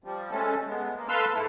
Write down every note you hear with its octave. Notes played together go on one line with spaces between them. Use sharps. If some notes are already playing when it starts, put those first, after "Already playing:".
F3 G3
G#3 A3 C#4 A4
G#3 B3
A#3
A4 B4 F5 C6 E6 F6
G#2 E4 A4